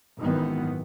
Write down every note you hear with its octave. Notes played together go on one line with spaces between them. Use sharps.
G#1 F#2 D#3 E3 B3